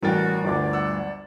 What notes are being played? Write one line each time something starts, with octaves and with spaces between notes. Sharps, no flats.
A1 G3 C#4 F#4 A#4 G5 A6
G1 D2 D5 D6
F#5 E6